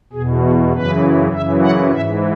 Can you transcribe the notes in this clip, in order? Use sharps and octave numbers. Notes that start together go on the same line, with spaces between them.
E2 B2 G#4
F#4
F#2 C#3 E3 B4
F#2 C#3 E3 E5
F#5
G#2 E3 E5